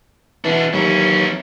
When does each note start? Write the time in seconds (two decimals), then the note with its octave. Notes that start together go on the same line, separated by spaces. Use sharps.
0.45 B2 E3 D4
0.73 D#2 E3 F#3 C#4